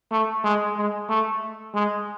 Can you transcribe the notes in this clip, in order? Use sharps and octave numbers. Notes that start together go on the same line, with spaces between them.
A3
G#3
G#3
A3
G#3